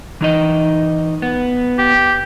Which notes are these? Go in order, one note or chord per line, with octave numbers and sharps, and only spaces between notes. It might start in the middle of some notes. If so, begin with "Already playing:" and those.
E3 D#4 D#5
B3
G4